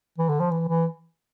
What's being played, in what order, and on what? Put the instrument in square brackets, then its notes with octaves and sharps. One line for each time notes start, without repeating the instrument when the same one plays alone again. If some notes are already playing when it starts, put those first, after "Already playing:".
[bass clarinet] E3
D3
F3
E3
E3